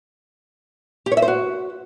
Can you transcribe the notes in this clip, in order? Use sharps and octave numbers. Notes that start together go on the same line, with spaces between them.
G4
C#5
E5
C5
F#4